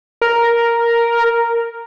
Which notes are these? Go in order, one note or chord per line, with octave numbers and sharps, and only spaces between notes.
A#4